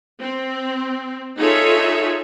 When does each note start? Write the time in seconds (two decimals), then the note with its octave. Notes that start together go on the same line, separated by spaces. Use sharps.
0.21 C4
1.38 D#4 F4 G#4 A4 C#5 E5